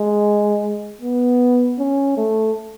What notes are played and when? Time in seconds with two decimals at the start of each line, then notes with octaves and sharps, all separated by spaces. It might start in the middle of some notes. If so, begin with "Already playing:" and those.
Already playing: G#3
1.01 B3
1.78 C#4
2.17 A3